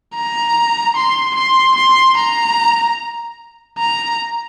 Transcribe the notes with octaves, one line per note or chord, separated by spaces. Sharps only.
A#5
C6
C6
C6
A#5
A#5